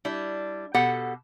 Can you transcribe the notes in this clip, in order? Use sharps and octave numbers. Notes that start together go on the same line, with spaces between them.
G3 D4 E4
B2 G4 A4 F#5